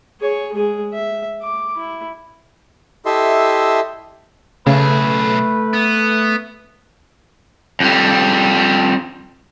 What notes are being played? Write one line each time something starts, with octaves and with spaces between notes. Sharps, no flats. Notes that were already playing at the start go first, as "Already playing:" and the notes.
G#4 C#5
G#3 G#4
E5
D6
E4
E4 G4 A4 D#5 E5 C6
B1 C#3 A3 G#4 B4
B3
F2 G3